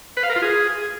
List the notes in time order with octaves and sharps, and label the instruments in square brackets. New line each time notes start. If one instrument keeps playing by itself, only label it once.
[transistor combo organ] B4
F5
A#4
F4
G#4